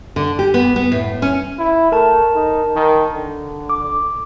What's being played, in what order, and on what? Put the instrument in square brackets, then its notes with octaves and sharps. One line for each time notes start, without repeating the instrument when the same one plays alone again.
[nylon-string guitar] D3
G4
B3
B3
A2
C#4
[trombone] E4
[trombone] A3 [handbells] A#4 A5
[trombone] D#4
D#3
D3
[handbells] D6